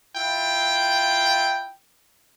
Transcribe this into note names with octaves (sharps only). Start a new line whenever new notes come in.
E4 F4 G5